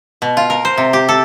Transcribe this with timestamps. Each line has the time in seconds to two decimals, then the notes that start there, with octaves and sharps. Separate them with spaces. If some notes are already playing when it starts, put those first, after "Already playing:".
0.22 B2
0.37 F4
0.50 A#4
0.65 C5
0.78 C3
0.93 G4
1.09 A4